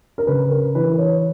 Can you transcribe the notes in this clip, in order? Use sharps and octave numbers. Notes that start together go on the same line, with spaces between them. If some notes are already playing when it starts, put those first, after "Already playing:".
A#4
C#3 B4
A#4
E3 B4
C#5